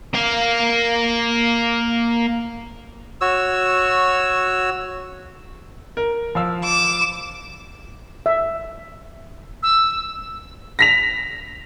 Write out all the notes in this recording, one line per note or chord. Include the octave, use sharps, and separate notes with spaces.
A#3 F5
F#4 C#5 E6
A#4
F3 F5 E6
D6 E7
E5
E6
A#6 B6 F7